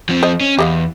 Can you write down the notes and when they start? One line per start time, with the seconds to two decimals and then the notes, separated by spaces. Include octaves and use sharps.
0.09 F3 C4
0.23 C5 D#5
0.41 C#4
0.58 E2 G4 D#5 F5